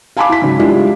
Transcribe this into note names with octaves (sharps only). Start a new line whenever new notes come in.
F5 G#5 A5 B5 C6 D6
E4 B6
G#2 C#3 F#3
G3 G#3 D4 E4 F4